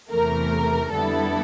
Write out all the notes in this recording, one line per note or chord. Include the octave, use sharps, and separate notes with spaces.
E2 C3 E3 A3 A#4
F2 D3 G3 B3 E4 A4